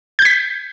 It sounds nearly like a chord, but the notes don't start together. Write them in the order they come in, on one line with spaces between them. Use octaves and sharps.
G6 G#6 B6